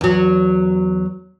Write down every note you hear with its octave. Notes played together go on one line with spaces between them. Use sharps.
E2 F#3